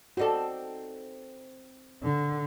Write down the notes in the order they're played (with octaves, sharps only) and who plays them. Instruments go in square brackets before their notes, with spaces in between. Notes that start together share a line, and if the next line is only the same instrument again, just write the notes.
[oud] C4 D#4 A4 [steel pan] F#4 D5
[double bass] D3